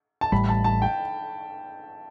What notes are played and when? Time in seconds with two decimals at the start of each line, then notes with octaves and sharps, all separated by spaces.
0.21 A5
0.32 A1 A2 G3 B5
0.49 A5
0.64 A5
0.82 G5